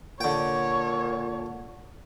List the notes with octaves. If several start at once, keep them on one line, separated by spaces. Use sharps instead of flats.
A#2 D3 C#5 G5